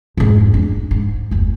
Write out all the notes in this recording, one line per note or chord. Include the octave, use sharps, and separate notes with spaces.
F2 G#2
D4
G#2
F#1 D#2